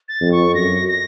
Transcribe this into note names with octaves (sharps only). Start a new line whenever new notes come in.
A6
F2
C#6
F#2 A#6
A#6